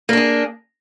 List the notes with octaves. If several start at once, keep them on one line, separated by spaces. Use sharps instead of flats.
A#3 D4 G#4